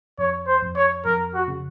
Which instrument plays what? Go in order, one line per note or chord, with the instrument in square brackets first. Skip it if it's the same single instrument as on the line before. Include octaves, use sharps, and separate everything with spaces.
[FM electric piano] F2 [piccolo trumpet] C#5
[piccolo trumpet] C5
[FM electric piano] F2
[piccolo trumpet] C#5
[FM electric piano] F2 [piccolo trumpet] A#4
[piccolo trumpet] F#4
[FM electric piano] C#3